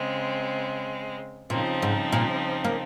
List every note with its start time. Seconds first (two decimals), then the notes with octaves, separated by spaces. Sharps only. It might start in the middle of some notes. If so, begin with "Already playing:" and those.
Already playing: C#3 G#3 C4
1.50 A#2 C#3 F3 C4 D#4
1.82 G#2
2.12 A#2
2.64 A#3